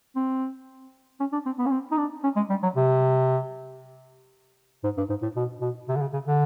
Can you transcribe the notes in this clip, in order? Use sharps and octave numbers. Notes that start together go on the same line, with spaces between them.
C4
C#4
D4
C4
B3
C#4
C4
D#4
D4
C#4
G#3
G3
F#3
C3
G#2
G2
G#2
A2
B2
B2
C3
D3
C#3
C#3
D3